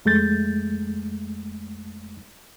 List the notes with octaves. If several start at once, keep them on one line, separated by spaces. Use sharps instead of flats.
F2 G#3 A3 G6 A6